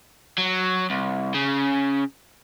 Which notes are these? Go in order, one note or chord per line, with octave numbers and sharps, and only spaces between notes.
F#3
C2
C#3